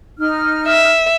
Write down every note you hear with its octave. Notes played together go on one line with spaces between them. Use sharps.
D#4 F6
E5